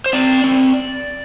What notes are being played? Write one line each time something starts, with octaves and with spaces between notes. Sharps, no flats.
C5
C4 D5
C4